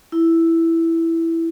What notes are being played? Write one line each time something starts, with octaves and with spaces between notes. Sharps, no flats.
E4